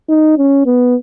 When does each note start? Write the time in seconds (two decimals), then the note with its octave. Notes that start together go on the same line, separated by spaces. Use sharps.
0.09 D#4
0.37 C#4
0.65 B3